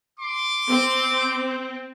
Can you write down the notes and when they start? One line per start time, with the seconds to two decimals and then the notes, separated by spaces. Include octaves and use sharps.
0.19 C6 D6
0.68 C4